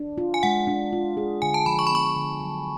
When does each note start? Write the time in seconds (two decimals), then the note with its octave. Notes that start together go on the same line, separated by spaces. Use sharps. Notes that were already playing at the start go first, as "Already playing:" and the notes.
Already playing: D4
0.18 F4
0.34 G#5
0.43 G#3 F#5
0.67 D4
0.93 F4
1.17 G#4
1.42 D3 G#5
1.54 A5
1.66 F3 B5
1.79 C#6
1.87 B5
1.92 B3 C#6
2.16 D3
2.40 F#3